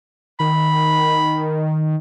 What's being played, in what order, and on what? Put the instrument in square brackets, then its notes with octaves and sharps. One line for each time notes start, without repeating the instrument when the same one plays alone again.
[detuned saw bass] D#3 [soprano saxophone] B5